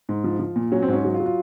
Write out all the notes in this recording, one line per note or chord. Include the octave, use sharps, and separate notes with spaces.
G#2
F3
F3
A#2
F#3 C#4
C4
G#2 C#4
F#3
F4
F#3
F4